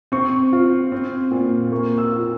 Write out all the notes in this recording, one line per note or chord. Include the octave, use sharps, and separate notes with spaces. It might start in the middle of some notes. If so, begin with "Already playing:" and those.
C4 C#6
F4
C4
A#2
A#3 C#6
E6
F4